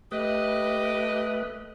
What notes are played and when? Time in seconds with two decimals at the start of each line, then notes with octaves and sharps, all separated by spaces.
0.12 A3 G4 B4 D#5